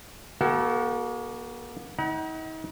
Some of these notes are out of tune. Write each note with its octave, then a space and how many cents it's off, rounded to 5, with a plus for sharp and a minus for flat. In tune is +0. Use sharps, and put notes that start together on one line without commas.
A#3 +45 F#4 +40 A4 +0
D#4 +40 F#5 +35 A#5 +45